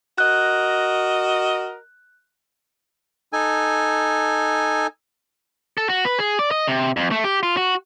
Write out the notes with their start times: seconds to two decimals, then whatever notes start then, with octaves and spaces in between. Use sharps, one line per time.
0.18 F#4 A#4 D#5 F#6
3.33 D#4 A4 G#5
5.78 A4
5.89 F#4
6.05 B4
6.19 G#4
6.39 D5
6.51 D#5
6.67 C3
6.97 F2
7.11 A3
7.24 G4
7.43 F4
7.57 F#4